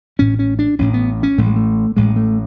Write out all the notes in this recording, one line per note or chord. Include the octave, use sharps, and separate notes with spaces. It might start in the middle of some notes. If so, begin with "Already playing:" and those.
A1 A2 C#4
C#4
D4
A1 A2 C#4
B3
C#4
A1 A2 A3
G#3
A3
A1 A2 G#3
A3